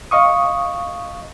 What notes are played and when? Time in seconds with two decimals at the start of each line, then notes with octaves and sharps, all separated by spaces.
0.11 D#5 F5 C#6 D#6